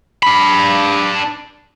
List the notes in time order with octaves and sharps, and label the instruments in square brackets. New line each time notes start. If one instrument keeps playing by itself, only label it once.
[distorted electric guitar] D4 B5